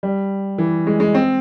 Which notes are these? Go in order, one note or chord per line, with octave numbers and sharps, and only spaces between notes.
G3
E3
G#3
G#3
C4